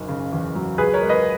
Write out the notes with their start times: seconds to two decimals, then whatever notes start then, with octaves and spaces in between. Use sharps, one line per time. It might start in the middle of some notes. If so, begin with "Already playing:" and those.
Already playing: F#1 B1
0.08 C#3
0.32 E2
0.55 F#3
0.78 C#2 G#4 B4
0.93 A#4 C#5
1.01 G#3
1.09 B4 D#5